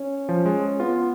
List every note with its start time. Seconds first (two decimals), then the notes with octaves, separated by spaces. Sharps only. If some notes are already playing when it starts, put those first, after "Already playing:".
Already playing: C#4
0.29 F3
0.46 G#3
0.80 B3 F4